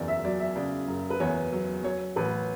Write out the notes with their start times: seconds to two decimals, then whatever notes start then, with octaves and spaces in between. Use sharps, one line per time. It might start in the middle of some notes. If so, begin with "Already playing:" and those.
Already playing: F#1 E2 C#3 D5
0.08 E5
0.25 F#3 D5
0.40 E5
0.56 C#3 D5
0.88 F#1
1.10 B4
1.20 E2 C#5
1.52 F#3
1.83 F#3 C#5
2.16 A1 B4